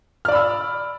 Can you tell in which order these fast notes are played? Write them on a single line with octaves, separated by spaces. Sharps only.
F6 D5 B5 E6